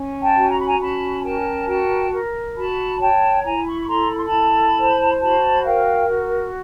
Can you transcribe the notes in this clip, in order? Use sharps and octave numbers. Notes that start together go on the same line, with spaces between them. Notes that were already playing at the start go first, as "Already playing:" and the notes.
Already playing: C#4
G5 A5
F#4
A#5
B5
G#5 A#5
C#4 A5 B5
A#4 G5 A5
F#4 G5 A5
A#4
F#4 A5 B5
C#5 G5 A5
E4 G#5 A#5
B5 C#6
C#6
A4 A#5 C6
B5
C6
A5 B5
E4
C5
F#4 A5 B5
A#4 F5 G5
F#4